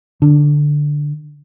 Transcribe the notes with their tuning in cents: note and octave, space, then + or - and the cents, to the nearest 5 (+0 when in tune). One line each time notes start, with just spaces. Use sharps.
D3 +0 D4 +0